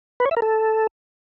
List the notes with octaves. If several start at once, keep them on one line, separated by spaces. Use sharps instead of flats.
B4
C#5
E5
A#4
A4